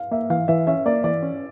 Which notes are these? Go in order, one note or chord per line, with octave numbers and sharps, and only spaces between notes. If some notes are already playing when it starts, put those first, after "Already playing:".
Already playing: F5
A#3 E5
E3 F5
E3 E5
C#4 E5
A#3 D5
E3 D5
C#4